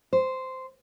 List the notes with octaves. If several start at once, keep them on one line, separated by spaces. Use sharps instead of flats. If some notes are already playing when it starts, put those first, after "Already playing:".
C5